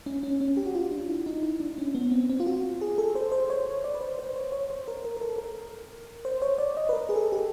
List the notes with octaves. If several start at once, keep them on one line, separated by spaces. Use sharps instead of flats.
C#4
C#4
C#4
G4
F#4
F4
D4
E4
D#4
E4
D4
C#4
B3
C4
C4
F4
F#4
G#4
A4
C5
C5
C#5
D5
B4
C5
C5
C#5
C#5
C5
A#4
A#4
A#4
A4
A#4
C5
C#5
D5
D#5
B4
A#4
G#4
A4
G4